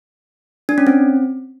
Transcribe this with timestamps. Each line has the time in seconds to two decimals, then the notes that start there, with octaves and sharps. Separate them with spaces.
0.69 D4
0.78 C#4
0.87 C4